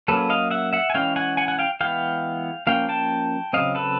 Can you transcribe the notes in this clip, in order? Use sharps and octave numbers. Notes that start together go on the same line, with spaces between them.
F#3 A#3 C#4 A4 B4
D#5 F5
E5 F#5
E5 F#5
G#5
E3 G#3 C#4 F5 G5
F#5 G#5
F#5 G#5
F#5 G#5
F5 G5
E3 G#3 B3 F5 G5
F3 A#3 C#4 F5 G5
G5 A5
C#3 F#3 A3 C4 D#5 F5
A4 B4